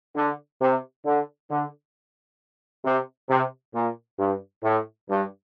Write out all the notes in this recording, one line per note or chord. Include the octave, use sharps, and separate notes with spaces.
D3
C3
D3
D3
C3
C3
A#2
G2
A2
G2